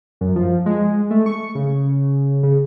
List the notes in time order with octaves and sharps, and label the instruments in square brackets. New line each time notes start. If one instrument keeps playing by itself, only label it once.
[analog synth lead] F#2
F3
G#3
A3
C#6
C#3
C#3